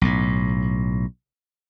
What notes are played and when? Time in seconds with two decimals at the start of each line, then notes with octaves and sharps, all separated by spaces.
0.01 B1 A2